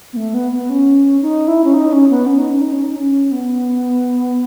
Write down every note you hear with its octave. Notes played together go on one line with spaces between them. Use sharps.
B3
A3
B3
B3
C#4
D#4
E4
C#4
D#4
C#4
B3
C#4
D#4
C#4
D#4
C#4
D#4
C#4
B3